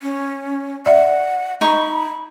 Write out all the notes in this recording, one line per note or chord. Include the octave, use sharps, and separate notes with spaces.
C#4
D5 E5 F#5
D#4 B5 C#6